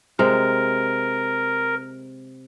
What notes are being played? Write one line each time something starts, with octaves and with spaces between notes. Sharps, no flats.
C3 G#3 A#4